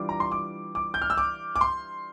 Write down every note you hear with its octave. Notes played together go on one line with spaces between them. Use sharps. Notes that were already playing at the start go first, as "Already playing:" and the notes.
Already playing: E3 G3 D4 F4 D6
A#5
C6
D6
D6
G6
F6
E6
D6
D6
C6